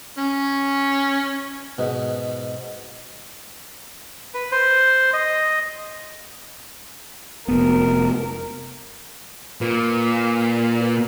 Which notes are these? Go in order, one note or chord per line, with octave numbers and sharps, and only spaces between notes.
C#4
G#2 B2
B4
C5
D#5
F1 B3 A#4
A#2 F4 B4